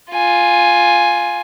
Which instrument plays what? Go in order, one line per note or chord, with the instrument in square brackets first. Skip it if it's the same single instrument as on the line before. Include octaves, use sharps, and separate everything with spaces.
[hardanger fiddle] F4 G#5